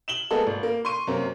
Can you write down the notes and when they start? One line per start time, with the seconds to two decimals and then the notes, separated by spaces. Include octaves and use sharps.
0.08 E7 F#7 G7
0.30 G#3 A#3 B3 G#4 A4 D#5
0.47 G#1
0.63 A#3
0.85 C6 C#6 D#7
1.07 F#2 C3 A#3 C4